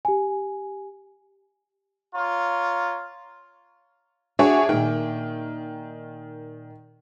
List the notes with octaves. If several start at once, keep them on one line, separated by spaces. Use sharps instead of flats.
G4 G#5
F4 C#5 A#5
D4 F#4 G#4 C#5 E5
A#2 D#3 G5